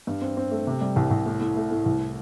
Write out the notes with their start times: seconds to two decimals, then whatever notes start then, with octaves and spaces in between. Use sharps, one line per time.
0.07 G2
0.21 C4
0.37 C4
0.51 A3
0.67 C3
0.81 G3
0.96 C2
1.11 C2
1.26 A2
1.40 A2
1.56 A3
1.71 A2
1.86 C2